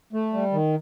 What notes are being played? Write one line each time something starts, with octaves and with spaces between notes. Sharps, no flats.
A3
G3
D#3